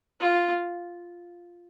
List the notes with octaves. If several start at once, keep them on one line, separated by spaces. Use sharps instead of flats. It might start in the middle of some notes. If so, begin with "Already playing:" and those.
F4